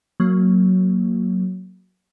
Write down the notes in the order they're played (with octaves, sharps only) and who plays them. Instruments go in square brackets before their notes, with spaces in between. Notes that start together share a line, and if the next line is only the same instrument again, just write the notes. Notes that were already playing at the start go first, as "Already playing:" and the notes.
[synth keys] F#3 A#3